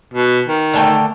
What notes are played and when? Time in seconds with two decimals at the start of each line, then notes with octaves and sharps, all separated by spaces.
0.14 B2
0.48 D#3
0.74 D3 A3 G5